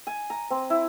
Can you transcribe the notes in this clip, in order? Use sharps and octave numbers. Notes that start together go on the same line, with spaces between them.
G#5
A#5
C4
E4